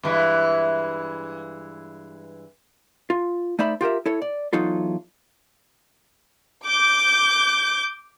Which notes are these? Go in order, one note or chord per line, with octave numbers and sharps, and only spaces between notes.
G2 E3 G#3
F4
A3 D#4 C5 D5 E5 B5
F4 G4 A#4 E5
E4 A4 C#5
D5
E2 F#3 D#4 F4 A4
D6 G6